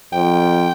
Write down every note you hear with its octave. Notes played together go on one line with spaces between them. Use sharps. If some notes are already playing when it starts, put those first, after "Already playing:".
F2 G5